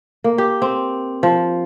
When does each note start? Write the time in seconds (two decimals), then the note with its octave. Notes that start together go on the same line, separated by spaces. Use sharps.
0.24 A#3
0.38 G4
0.62 C4
1.23 F3